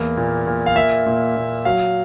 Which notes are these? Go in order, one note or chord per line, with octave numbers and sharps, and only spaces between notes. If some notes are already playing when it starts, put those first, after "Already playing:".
Already playing: E2 A#3
A#2
A#2
F5
A#3 E5
A#2
A#2
F#3 F5